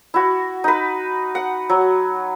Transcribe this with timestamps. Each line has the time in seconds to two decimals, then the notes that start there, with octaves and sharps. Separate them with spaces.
0.14 E4 F#4
0.64 D#4 B4
1.35 F#5
1.69 F#3